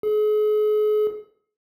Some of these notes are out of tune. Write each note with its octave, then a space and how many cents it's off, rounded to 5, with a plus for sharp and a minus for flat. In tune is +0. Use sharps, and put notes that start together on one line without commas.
G#4 +40